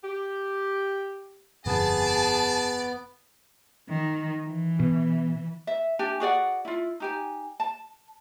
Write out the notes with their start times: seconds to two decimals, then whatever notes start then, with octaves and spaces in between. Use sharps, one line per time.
0.04 G4
1.66 G1 F2 B2 B3 G#4 D5 A5
3.89 D#3
4.46 E3
4.80 B2
5.67 E5
5.99 D4 G4 G#5
6.20 F#4 G#4 D5 F#5
6.65 E4 F4
7.00 D#4 G4 G#5
7.60 A5